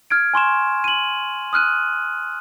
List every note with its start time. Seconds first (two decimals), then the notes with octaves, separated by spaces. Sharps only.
0.10 F6 G#6 D7
0.34 G#5 C6 C#6 E7
0.84 D#7 F#7
1.53 D#6 F6 F#6 D#7